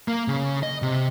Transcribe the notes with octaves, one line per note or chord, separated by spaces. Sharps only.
A#3
C#3
D#5
C3